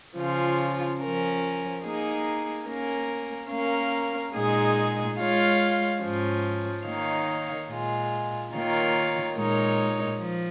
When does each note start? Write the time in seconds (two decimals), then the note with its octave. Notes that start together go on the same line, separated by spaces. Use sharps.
0.17 C#3 F3 C#4 F4
1.00 F3 C#4 A#4
1.84 A#3 D#4 G#4
2.67 A#3 C#4 A#4
3.50 A#3 C#4 A#4 F5
4.35 A#2 G#3 D#4 G#4
5.18 G#3 F4 C#5 F5
6.02 G#2 F3 C#4
6.86 D#3 A#3 D#4 C#5 F5
7.69 A#2 G#3 F4
8.53 D#3 A#3 F4 C#5 F5
9.37 A#2 G#3 D#4 A#4 C#5
10.20 F3